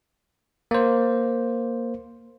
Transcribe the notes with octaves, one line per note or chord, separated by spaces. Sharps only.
A#3 C5